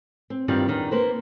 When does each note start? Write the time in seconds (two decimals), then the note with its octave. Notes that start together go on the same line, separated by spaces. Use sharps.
0.30 C4
0.48 G2 D#3 G3 C4 F4
0.68 E2 D#3 D4
0.91 A#3 B4 C5